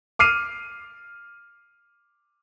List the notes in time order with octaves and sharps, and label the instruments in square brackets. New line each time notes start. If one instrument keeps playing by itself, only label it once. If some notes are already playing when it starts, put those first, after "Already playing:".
[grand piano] D6 F6 C7 D#7